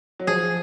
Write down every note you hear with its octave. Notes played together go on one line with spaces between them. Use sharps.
F#3
F3 G#4